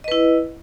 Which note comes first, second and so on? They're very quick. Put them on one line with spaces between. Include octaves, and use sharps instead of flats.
D#5 B4 E4